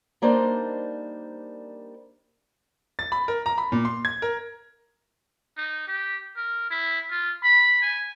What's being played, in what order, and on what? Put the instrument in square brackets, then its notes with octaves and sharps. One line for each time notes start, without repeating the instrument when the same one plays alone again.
[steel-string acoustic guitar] G3 A#3 D4 D#4 C5
[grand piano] A6
B5
A#4
A#5
B5
A#2
C6
G#6
A#4
[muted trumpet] D#4
G4
A#4
E4
F4
B5
G#5